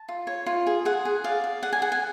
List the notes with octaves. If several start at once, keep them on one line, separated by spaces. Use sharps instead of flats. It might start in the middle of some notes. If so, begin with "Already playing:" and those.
Already playing: A5
F4
C#5
F4
G#4
G#4 F#5
G#4
D5 F5
D5
G#4 F#5
G#5
G#4 F#5
G#5